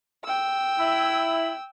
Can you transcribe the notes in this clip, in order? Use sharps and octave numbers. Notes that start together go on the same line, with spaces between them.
G5 E6
E4